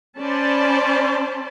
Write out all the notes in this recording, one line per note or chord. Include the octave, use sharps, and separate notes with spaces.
C#4 C5 D5 A5 B5